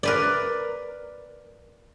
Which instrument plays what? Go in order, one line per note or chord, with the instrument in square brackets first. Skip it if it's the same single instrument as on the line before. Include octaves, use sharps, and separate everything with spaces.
[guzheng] A#4 B4 D5